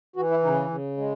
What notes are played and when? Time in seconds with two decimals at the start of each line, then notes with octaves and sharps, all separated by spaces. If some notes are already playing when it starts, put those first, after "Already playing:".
0.16 E3 F#4
0.30 E4
0.44 C#3 D#4
0.70 C#3
0.97 G#3